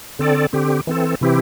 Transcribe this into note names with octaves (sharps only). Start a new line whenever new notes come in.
D3 C4 A4 D5
D3 C4 G4
E3 C4 A4
C3 E3 C4 E4 G4